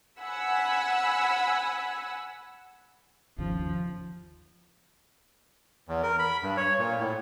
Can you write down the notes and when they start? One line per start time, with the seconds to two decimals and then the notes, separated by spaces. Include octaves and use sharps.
0.21 F#5 G#5 B5 E6
3.38 G1 D#2 C#3 F3
5.89 E2
6.03 A#4
6.19 B5
6.43 G2
6.57 C#5
6.79 A#2
6.99 A2